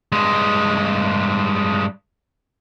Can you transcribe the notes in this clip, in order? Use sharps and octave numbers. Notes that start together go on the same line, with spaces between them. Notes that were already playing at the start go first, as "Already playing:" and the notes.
G2 G#3